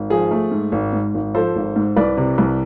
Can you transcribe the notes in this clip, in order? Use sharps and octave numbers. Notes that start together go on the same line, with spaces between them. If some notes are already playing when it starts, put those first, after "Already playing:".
Already playing: G#1
F3 G#4
A3
G#2
G#1
G#2
G#1
F3 A4 C5
G#1
G#2
C2 B4 D5
C3
C2